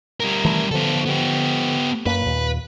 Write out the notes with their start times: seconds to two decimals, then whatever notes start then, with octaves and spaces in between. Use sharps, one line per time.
0.20 G3 A#4
0.45 D#3 E3 A3
0.71 D3 F3 B3 A4
1.06 B3 G4
2.06 F#2 A#3 B4
2.22 D#2 A#2